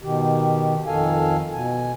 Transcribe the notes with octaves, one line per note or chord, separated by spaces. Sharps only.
B2 D#3 G4
F2 D#3 A4 F5 G#5
B2 G#5